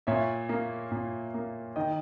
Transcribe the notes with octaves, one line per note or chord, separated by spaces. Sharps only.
A#2 C#5 E5
A#3
A#2
A#3
D#3 D#5 G5